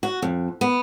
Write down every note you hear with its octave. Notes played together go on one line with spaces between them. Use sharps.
F#4
F2
B3